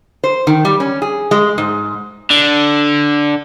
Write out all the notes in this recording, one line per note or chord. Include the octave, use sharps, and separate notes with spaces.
C5
D#3
G3
C#4
G#4
G#3
G#2
D3